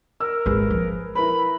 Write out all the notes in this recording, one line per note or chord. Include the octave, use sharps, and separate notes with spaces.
A#4 E6
G#1 G#4 B4
F3
E4 A#4 B4 B5